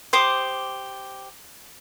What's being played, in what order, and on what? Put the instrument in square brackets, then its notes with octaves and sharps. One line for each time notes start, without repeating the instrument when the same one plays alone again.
[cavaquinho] G4 C5 D6 D#6